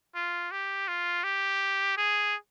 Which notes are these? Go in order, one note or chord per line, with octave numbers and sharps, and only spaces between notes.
F4
G4
F4
G4
G#4